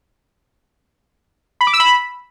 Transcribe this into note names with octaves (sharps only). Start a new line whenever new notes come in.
B5
D6
E6
B5